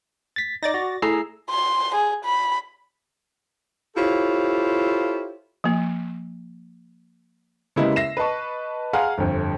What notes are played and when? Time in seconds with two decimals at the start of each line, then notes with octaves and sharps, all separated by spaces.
0.36 A6 B6
0.63 D#4 D5 A6 A#6
0.74 F#4
1.02 A3 E4 G#4 A#5 E6 C7
1.50 C6
1.95 G#4
2.25 B5
3.96 E4 F4 G4 A4 C5 C#5
5.64 F3 A#3
7.76 C#3 G3 G#3 A#3 B3 E4
7.96 E5 A#6 C7 E7
8.17 B4 D#5 A5 C#6
8.93 G#4 F5 F#5 A#5 C6 F6
9.18 G1 F2